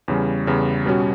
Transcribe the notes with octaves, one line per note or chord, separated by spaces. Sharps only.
E2 C#3 G3
E2 C#3 G3
B2 G3 C#4 F#4